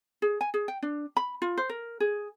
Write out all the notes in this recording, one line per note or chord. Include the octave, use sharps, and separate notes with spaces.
G#4
G#5
G#4
G5
D4
B5
F4
C5
A#4
G#4